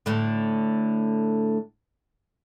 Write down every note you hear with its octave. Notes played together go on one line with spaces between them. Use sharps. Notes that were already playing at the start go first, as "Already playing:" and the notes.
A2 D3